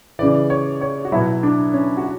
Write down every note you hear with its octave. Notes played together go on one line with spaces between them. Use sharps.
C#3 E3 D5
C#5
C#5
F#4
B2 F#3 E4
D4
C#4
F#4